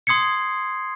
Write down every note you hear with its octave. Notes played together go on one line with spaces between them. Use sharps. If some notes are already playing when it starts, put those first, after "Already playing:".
C6 D#6 G#6 C7 C#7